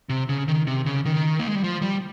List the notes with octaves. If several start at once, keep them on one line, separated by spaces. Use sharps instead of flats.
C3
C#3
D#3
C3
C#3
D#3
A#3
G#3
G3
F3
G3